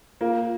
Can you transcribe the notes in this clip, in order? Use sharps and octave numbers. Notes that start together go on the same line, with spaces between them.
A#3 F4